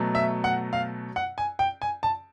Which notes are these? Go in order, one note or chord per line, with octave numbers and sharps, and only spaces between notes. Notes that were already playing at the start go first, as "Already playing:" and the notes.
Already playing: B2 F#3 A3
E5
F#5
F5
F#5
G#5
G5
G#5
A5